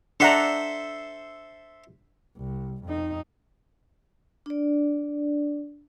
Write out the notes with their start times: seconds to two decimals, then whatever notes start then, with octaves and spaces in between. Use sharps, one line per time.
0.20 D4 A4 C5 E5 F#5 A#5
2.37 C2
2.85 F2 D#4
4.46 D4 D5